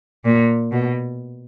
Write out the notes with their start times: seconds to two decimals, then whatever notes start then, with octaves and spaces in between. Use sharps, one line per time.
0.25 A#2
0.72 B2